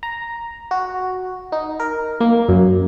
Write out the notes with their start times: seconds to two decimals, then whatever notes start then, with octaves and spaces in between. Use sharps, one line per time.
0.03 A#5
0.71 F#4
1.52 D#4
1.80 A#4
2.21 A#3
2.49 F#2